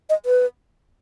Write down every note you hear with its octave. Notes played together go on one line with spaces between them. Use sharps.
D#5
B4